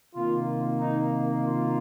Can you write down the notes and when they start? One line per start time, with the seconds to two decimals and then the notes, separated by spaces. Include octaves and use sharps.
0.15 C3 D#3 A#3 F4
0.80 D#4
1.44 F4